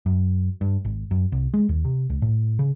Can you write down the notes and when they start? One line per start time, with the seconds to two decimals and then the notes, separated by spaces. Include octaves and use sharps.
0.06 F#2
0.61 G2
0.85 G#1
1.11 F#2
1.32 C2
1.54 G#3
1.69 D#2
1.84 C3
2.10 C#2
2.22 A2
2.59 C#3